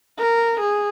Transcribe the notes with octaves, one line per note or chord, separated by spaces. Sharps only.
A#4
G#4